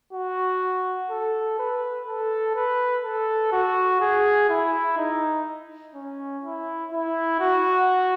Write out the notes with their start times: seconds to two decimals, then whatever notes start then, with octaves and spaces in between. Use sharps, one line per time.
0.13 F#4
1.10 A4
1.59 B4
2.08 A4
2.55 B4
3.05 A4
3.53 F#4
4.01 G#4
4.49 E4
4.97 D#4
5.94 C#4
6.44 E4
6.92 E4
7.40 F#4